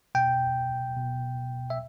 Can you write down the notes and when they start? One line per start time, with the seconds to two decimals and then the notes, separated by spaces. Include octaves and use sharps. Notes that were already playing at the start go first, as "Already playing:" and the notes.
0.15 B2 G5
0.97 B2
1.70 E5